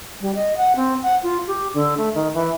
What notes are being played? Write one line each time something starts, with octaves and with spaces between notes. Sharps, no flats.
G3
D#5
F#5
C4
F#5
F4
G4
D3
A3
D#3
E3